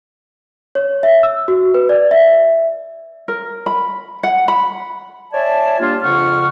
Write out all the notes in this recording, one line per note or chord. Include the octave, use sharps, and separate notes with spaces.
C#5
E5
E6
F#4
B4
D5
E5
A#4
B5
F#5
B5
C#5 D5 E5 G#5 A5
G3 A#3 D4 F4
F2 C#3 F4 F#5 C#6 F6